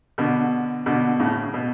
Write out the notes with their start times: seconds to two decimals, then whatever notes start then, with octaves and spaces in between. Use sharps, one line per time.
0.18 B2 D3
0.86 B2 D3
1.20 A2 C#3
1.54 B2